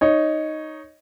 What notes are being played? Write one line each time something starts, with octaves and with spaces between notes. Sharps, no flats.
D#4 C#5